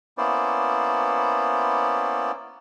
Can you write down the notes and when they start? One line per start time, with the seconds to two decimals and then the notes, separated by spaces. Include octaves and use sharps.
0.18 A#3 B3 C#4 E4 C5 D5